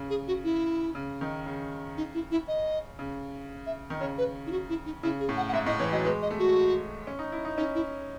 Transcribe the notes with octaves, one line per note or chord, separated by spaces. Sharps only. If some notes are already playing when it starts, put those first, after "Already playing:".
Already playing: C#3
G#4
F#4
E4
C#3
D#3
C#3
D#4
E4
E4
D#5
C#3
E5
D#3
C#3 C#5
B4
E4
F#4
E4
D#4
C#3 E4
G#4
A2
F#5
F#5
G#2 E5
A2 D#5
E3 C#5
F#3 D#5
G#3 B4
D#5
A3
F#4
C#4
D#4
E4
D#4
C#4 D#4
E4